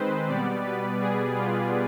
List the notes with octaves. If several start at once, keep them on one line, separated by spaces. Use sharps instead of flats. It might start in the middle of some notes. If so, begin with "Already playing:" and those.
Already playing: D#3 G#3 C4 B4 C5
B2 G3 B3 D5
B4
G#4
F4